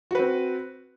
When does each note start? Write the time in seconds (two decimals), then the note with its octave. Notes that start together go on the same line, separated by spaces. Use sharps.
0.11 F#4
0.15 B4
0.19 C4